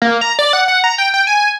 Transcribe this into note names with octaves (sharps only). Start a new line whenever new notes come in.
A#3
A#5
D5
F#5
F#5
A#5
G5
G5
G#5